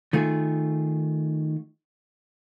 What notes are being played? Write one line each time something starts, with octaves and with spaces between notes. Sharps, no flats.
D#3 A3 F4 G#4